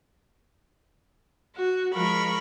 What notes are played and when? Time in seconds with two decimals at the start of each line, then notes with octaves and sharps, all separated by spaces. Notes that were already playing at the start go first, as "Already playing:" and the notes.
1.56 F#4
1.94 F3 G#3 A#4 B5 C#6